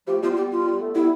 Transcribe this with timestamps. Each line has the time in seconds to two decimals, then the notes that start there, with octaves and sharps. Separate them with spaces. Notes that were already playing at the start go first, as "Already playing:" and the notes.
0.07 F3 A3 G4
0.22 G3 B3 F4
0.37 G3 B3 G4
0.52 F4
0.67 G3
0.81 A3
0.95 G3 B3 E4